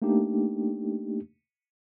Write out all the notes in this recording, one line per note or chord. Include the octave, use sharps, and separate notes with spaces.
A3 A#3 D4 D#4 G4